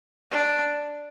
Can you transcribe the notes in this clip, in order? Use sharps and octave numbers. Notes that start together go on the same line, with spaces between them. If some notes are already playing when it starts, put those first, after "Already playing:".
D4